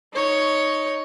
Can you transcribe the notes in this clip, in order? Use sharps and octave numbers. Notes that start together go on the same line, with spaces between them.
D#4 C#5